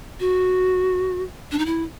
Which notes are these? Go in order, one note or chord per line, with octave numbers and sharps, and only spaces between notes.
F#4
D4
D#4
E4